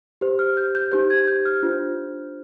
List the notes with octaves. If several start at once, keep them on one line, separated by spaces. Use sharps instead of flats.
G4 C5
F6
G6
G6
D#4 G4 C5 G6
G#6
G6
F6
D4 F4 C5